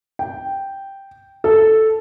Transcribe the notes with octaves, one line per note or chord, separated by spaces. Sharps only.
G5
A4